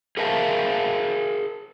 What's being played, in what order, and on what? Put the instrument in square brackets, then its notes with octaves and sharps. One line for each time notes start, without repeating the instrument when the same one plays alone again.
[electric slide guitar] G#4 A#4 C5 E5 F5 A5